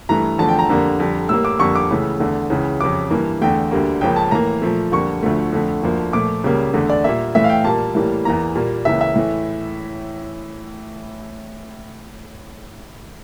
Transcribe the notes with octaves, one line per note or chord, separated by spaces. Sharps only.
G2 E3 A3 A#5
E2 D3 F3 A3 A5
G5
A#5
F2 D3 G3 A#3
F2 D3 G3
A2 G3 A#3 E6
D6
F2 D3 G3 A#3 C#6
D6
C#2 C#3 E3 A3
E2 D3 A3
C#2 C#3 E3
F2 C#3 G3 D6
G2 E3 A#3
E2 D3 A3 G5
D2 D3 G3 A#3
C#2 C#3 F3 A#3 G5
A5
A2 E3 A#3 A#5
A#2 F3 A3
F2 D3 G3 A#3 C#6
D2 D3 F3 A3
F2 D3 A3
D2 D3 F3 A#3
A#2 F3 A3 D6
C#2 C#3 G3 A#3
E2 D3 A3
D5
A#2 G3 A#3 E5
A2 E3 A3 E5
F5
G5
A#2 G3 A#3 A5
A2 E3 G3 A#3
E2 E3 A#3 A#5
A#2 G3 A#3
C#2 C#3 E3 A#3 E5
E5
A2 E3 A3